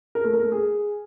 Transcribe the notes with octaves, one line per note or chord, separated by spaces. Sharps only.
A#4
A3
A#4
A3
G#4